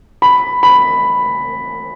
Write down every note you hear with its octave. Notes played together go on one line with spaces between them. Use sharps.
B5
B5